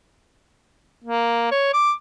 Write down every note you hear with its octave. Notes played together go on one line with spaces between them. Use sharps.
A#3
C#5
D6